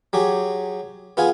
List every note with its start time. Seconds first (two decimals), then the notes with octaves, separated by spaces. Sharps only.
0.13 F#3 G4 G#4
1.17 B3 F4 G#4 G#5